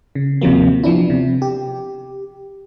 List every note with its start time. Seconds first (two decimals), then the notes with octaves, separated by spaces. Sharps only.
0.15 C#3
0.41 D#2 C3 F3 F#3 A#3
0.83 F3 B3 D4 E4
1.10 C3
1.42 G4